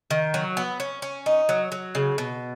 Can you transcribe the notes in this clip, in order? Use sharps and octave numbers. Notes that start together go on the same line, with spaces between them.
D#3
F#3
B3
C#4
C#4
D#4
F#3
F#3
C#3
B2